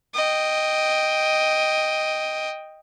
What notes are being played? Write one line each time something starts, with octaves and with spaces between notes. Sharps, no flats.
D#5 G5